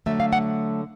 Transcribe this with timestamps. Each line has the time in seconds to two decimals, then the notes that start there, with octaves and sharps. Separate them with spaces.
0.06 D3 F#3 A3 E5
0.20 F5
0.33 F#5